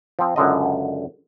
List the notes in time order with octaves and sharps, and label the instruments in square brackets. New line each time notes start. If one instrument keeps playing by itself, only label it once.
[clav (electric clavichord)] F3 C4
C#2 F#2 D3 D#5